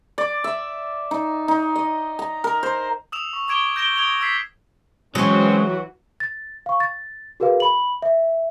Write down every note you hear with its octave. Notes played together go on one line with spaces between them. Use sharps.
D5
E5
D#4
D#4
D#5
A#5
A#4
C5
D#6 E6 E7 F7
C#6
C#6 D6 G#6 D7 E7 G7
G6 A#6 D7 E7 G7
D#6 G#6 D7 F7 G7
E6 G#6 B6 C7
E3 F#3 G#3 C4 C#4 F#4
A6
F5 C#6
A6
F#4 G#4 A#4 B4 F5
B5 F#7
E5